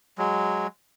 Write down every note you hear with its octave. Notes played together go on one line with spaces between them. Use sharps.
F#3 G#3